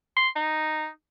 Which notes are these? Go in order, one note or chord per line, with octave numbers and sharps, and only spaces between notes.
C6
D#4